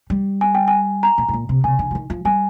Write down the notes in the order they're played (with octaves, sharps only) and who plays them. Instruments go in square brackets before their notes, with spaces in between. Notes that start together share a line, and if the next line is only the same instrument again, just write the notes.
[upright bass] G3
[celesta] G#5
G5
G#5
A#5
[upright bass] A#2
G#2
A#2
C3
[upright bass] C3 [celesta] G#5
[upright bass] D3
F3
D#3
F3
[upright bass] G3 [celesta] G#5